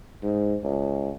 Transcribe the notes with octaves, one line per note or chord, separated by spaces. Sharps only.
G#2
C#2